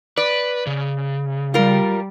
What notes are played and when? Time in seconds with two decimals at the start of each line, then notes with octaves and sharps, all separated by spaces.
0.17 B4 D5
0.67 C#3
1.54 G3 F4 A#4